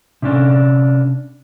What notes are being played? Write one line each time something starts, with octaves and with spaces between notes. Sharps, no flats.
C3 C#4 D4